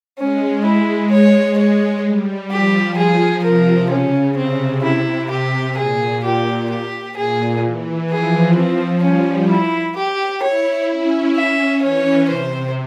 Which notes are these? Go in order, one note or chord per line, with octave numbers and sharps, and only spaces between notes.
G#3 C#4
E4
C#5
C#5
G3
F3 G4
G#4
C3 A#4
C#3 C#4
C3 C4
E4
G4
A#2 G#4
G4
G4
A#2 G#4
E3
F3 G#4
C4
G3 C#4
E4
G4
E4 C#5
C#4
E5
E3 C#5
C3 C5